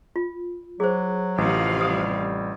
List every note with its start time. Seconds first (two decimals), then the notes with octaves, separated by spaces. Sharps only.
0.16 F4
0.80 F#3 G#4 C5
1.38 A1 C3 F3 F5
1.81 G3 D#6